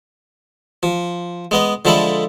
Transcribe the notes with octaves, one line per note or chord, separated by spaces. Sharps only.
F3
G#3 B3 D#5
D3 F3 G#3 A4 E5 B5